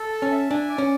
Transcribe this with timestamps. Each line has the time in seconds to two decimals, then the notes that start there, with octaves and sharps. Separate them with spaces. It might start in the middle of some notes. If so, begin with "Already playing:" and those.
Already playing: A4
0.13 A5
0.22 C#4
0.31 E5
0.50 D4 G#5
0.69 D5
0.78 C#4